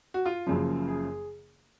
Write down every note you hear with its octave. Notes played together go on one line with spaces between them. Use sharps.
F#4
F4
F#1 F#2 C#3 F3
G#4